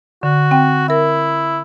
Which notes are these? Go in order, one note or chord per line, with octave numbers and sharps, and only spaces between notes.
D3 F#4
C4 G5
E4 A#4 E5